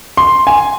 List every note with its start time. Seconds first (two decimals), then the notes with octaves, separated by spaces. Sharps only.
0.17 C6
0.47 G#5